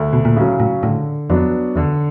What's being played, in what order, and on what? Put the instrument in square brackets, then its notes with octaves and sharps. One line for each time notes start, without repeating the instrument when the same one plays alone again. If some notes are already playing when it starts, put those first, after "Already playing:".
Already playing: [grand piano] D2
[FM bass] B2
A#2
[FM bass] A2 [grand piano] C#3
[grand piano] F#3
[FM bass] A2
[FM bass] A2 [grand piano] D3
[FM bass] F2 [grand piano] F#3 B3 D4
[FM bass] E2 [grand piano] D3